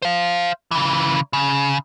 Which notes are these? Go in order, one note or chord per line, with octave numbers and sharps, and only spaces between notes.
C5 F5
C#3 E3
C#3